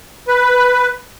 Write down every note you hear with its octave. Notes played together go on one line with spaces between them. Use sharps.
B4